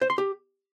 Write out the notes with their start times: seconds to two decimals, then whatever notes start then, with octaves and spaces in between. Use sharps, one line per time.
0.01 C5
0.10 C6
0.18 G4